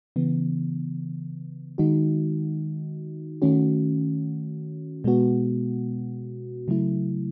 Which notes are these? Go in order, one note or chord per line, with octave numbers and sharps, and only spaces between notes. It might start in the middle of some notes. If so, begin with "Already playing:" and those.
C#3 E3 B3
D#3 G#3 D#4 F#4
D#3 A3 C#4 F#4
B2 G#3 B3 F#4
C#3 F#3 A3 E4